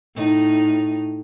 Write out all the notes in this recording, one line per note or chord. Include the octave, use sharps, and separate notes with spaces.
A2 D#4